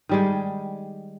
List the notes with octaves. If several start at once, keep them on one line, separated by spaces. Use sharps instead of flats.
D#3 G3 G#3